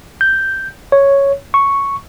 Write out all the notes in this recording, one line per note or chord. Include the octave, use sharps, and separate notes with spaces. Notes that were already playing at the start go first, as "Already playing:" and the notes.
G6
C#5
C#6